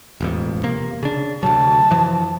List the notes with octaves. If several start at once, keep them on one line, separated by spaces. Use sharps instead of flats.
E1 A1 F2
C3 A#3
C#3 D4
D2 C3 F#3 A5
F#2 E3 F3